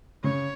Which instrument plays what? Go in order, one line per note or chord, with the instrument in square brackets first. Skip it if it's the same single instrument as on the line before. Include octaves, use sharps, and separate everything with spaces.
[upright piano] C#3 [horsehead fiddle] C#5